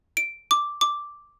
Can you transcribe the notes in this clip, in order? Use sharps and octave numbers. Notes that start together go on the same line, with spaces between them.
D7
D6
D6